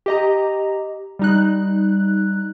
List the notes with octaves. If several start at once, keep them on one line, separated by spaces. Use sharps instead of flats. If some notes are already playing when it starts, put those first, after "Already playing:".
G4 D#5 A#5
G3 D#4 F#6